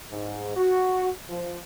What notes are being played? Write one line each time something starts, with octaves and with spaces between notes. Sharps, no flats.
G#2
F#4
F3